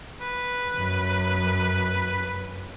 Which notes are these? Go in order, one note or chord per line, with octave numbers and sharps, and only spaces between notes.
B4
F#2